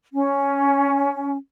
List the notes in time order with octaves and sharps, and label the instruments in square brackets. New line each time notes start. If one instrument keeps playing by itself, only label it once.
[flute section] C#4